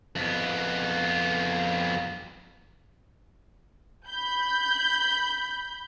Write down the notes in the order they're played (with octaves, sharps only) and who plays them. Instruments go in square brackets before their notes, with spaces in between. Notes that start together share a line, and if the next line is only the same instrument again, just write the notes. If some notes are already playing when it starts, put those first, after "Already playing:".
[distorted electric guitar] F2 B3
[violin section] B5 G6